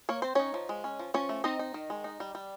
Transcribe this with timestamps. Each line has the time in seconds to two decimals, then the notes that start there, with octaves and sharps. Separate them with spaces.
0.09 A#3 C#5
0.22 C4 C5
0.35 C#4 D#4 C#5
0.54 F3
0.69 G#3
0.84 C#4
0.99 F3
1.14 F3 C#4 C#5
1.29 A3
1.44 C4 D#4 D#5
1.59 D#4
1.74 D#3
1.90 G#3
2.04 D#4
2.20 G3
2.35 G3